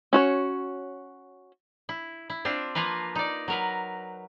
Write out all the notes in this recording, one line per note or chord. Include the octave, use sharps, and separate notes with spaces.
C#4 F#4 C#5
E4
E4
C4 D4 F4
F3 A#3 F4 A#4 B4
D#4 D5
F#3 A#4 B4